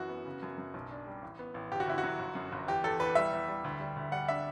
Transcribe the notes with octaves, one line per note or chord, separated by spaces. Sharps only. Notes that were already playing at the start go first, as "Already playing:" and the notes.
Already playing: F#2 E3 F#4
B3
C#3
F#2
F#2
B1
D4
G3
A1
B3
A1
G1 G4
F#4
G1 E4
F#4
F#3
G1
F#2
G1
E2 G4
E2 A4
E2 B4
G3 E5
E2
G3
D2
G3
D2
G3 F#5
D4 E5